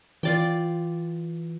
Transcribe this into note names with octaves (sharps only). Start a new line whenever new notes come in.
E3 F4 D5 G5